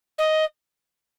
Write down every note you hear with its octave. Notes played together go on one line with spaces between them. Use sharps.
D#5